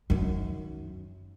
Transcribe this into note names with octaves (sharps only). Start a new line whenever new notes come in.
F#2 D#3